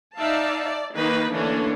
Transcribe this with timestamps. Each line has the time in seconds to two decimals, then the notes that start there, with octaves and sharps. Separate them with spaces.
0.17 D#4 D5 E5 F5 A5
0.66 D5
0.96 D#3 A#3 D#4 B4
1.32 D3 E3 A3 A#3 C#4 D4